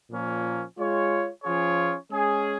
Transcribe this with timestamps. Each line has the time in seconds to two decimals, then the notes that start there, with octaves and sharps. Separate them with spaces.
0.10 A#2 F3 A#3 C#4
0.77 G#3 F4 C#5
1.43 F3 C#4 F4 G#4 C#5
2.09 G#3 C#4 G#4